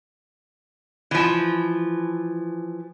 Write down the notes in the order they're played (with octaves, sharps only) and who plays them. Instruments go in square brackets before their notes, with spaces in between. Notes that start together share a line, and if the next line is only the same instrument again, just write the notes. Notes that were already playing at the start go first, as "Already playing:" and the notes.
[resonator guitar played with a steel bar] E3 F3